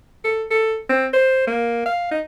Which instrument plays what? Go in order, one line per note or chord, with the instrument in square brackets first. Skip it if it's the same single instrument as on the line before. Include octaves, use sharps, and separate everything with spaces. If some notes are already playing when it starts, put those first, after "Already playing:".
[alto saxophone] A4
A4
C4
C5
A#3
F5
D#4